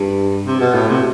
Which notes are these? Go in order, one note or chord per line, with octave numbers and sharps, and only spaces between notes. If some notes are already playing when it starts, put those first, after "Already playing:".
Already playing: G2
C3
B2
A2
C3